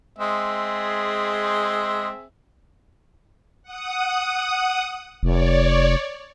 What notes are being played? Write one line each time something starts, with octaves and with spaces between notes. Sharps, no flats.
G#3 C4 G#4 E5
F#5 D#6
F1 C#5 D5